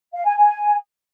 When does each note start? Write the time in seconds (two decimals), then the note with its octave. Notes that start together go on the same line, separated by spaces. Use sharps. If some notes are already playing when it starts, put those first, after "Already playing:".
0.13 F5
0.25 G#5
0.37 G#5